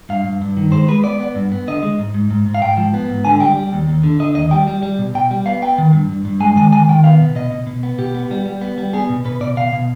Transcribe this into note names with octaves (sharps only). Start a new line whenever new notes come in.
G2 F5
G2
G2
D#3
G#3 C5
G#3 B4
B3 D5
B3
G2
B3
D3 D#5
G#3
G#2
G#2
G#2
G#2
F5
G#2 G5
F3
B3
G#2
D3 G#5
G3 G5
G3
D#2
D#2
D3
D3 D#5
D#2 D#5
G3 G5
G3
G3
B2
B2 G5
G3
B3 F5
B3 G5
D#3
G2
G2
G2
G#3 G#5
D#3 G#5
D#3 G#5
D#3 G5
B3 F5
B2
B2 D#5
B2
B2
B3
B2 G4
B3
G3
G3
B3
G3
B3 G#4
B2
B2 B4
B2 D5
B2 F5
B2